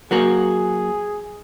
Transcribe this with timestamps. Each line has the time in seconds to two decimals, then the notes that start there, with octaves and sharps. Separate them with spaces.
0.11 F#3 A#3 F#4 G#4